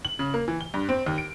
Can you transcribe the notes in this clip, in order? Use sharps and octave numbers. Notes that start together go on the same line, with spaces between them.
F#7
C#3
A#3
E3
G7
G2
C4
D#2
D7